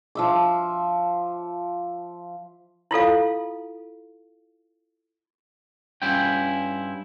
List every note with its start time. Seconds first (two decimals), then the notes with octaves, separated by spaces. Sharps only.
0.15 F3 E5 D6
2.91 E4 F4 A4 F5
6.02 G2 C#4 E4 F4 G5